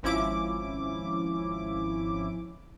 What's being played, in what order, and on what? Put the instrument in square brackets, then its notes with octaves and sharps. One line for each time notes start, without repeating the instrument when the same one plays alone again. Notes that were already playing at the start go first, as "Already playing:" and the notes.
[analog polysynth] G#1 F3 C#4 E4 D6